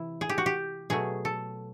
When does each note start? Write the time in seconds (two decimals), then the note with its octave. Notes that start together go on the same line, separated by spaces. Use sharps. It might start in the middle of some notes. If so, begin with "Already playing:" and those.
Already playing: C3 E3 E4
0.21 G#4
0.29 G4
0.38 F#4
0.46 G4
0.90 B2 F#3 A3 G#4
1.25 A4